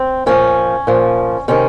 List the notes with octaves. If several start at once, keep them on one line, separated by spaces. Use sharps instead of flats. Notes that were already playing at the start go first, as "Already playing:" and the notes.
Already playing: C4
A#2 F3 C#4
A#2 F3
C3 D#3 C#4